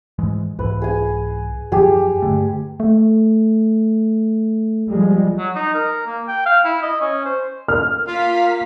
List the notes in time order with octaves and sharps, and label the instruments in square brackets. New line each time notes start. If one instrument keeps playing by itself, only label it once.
[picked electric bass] G#2 E3 G#3
[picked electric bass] C2 G#2 E3 [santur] B4
[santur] G#4 G#5
[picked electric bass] F#2 F3 F#3 [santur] G4 G#4
[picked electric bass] G2 D3 A3
[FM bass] A3
[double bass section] F3 G3 G#3
[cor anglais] F#3
D#4
A#4
A#3
G5
F5
E4
D#5
C#4
C5
[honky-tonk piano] F6
[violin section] A#3 F5 B6 [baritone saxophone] F4